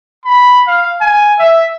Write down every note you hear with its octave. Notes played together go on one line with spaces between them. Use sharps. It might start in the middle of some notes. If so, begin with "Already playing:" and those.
B5
F5
G#5
E5